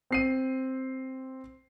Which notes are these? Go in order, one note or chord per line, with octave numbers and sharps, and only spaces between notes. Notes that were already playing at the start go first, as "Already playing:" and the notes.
C4 C7 D#7